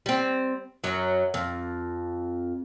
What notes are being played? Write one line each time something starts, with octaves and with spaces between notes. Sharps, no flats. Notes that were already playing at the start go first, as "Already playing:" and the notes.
G3 C4
F#2 F#3
F2